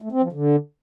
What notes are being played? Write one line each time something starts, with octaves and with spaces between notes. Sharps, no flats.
A3
C4
F3
D3